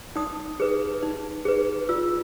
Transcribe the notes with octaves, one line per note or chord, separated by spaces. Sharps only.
D#4 D#6
G#4 B4
D#4
G#4 B4
F4 E6